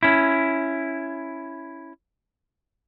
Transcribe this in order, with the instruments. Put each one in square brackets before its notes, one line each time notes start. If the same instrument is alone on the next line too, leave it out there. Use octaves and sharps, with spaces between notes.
[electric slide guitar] C#4 E4